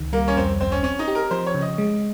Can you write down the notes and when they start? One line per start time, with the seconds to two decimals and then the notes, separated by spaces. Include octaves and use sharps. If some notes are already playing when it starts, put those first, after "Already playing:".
Already playing: C#2 D#3
0.13 G3 A#3
0.28 C#4
0.36 F2 C4
0.60 G1 C4
0.72 C#4
0.83 C4 C#4
0.99 D#4
1.08 G4
1.15 A#4
1.31 F3 C5
1.46 C#5
1.54 C#3
1.62 D#5
1.78 G#3